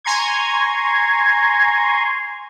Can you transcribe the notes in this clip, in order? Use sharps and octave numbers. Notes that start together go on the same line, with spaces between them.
G#5 A#5 C6 C#6 G#6